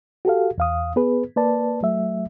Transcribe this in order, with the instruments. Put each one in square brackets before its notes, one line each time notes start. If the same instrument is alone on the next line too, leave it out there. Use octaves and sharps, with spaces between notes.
[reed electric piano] F#4 G4 A4 F5
E2 F5 D#6
B3 G#4 B4
A#3 B4 D5 A5
F#3 A3 E5